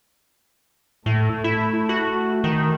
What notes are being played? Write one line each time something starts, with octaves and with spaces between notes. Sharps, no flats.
A2 A3
E4
F#4
D#3